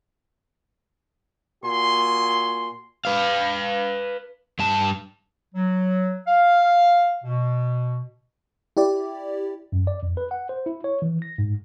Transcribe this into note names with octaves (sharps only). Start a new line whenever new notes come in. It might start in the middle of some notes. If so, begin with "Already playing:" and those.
A#2 F#4 G#5 C6
B4 F5
G2 A5
F#3
F5
B2
E4 G4 D5
F#2
D5
F2
B4
F#5
C5
E4
C#5
E3
A#6
G#2